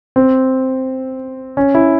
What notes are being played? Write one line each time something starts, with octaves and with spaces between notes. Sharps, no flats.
C4
C#4
E4